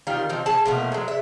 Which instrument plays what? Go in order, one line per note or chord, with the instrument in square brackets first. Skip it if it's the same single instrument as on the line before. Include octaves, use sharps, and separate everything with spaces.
[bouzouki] D#3 G3 F4
F3 C4 D#4
G#4 A5
B2 F3 A3 A#3
F#3 G#3
E5